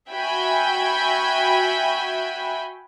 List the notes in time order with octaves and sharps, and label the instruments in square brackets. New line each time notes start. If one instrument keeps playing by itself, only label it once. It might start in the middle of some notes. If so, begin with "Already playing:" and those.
[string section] F#4 E5 G5 G#5 B5